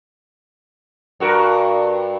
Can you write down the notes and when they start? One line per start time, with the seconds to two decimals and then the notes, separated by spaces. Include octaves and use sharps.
1.20 G2 F#4 A#4